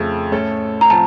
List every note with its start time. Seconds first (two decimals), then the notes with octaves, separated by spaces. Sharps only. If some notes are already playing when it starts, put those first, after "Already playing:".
Already playing: F2 C#3 A3
0.32 A2 A3 C#4 A4
0.81 A#5
0.90 A2 F3 C4 A5